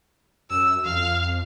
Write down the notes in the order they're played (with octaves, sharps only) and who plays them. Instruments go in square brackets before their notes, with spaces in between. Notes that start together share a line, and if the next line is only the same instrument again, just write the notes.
[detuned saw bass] F#2 [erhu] E6
[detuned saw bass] F2 [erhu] F5